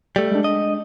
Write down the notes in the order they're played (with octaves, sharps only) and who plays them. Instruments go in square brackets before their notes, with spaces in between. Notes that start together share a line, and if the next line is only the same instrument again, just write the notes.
[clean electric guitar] G3 A3
[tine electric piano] G#3 D4
[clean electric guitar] D#5